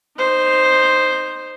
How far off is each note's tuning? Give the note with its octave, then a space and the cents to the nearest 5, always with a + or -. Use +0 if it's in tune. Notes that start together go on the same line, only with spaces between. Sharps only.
D#4 -15 C5 +0